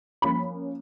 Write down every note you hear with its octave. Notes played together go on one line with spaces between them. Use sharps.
F3 A#3 C#4 B5